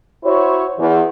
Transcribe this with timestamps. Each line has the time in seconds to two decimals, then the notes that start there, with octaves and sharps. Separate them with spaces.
0.24 E4 F#4 C5 C#5
0.78 E2